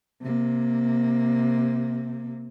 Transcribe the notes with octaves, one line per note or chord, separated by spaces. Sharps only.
C3 A#3